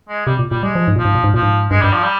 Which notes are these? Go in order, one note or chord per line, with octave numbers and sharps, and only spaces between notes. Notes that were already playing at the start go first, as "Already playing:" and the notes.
G#3
C3 G3
A#2
A#2 G3
G3 G#3
F3
G#2
A#2 F3
G#2
A#2
G#2
A#2 F3
G#2
G2 G#3
G2 G3
F3
G3